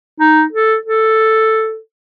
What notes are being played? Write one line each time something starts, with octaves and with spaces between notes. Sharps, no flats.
D#4
A4
A4